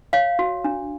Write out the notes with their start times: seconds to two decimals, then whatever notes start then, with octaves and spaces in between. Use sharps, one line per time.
0.13 C#5 F5
0.39 F#4
0.64 D4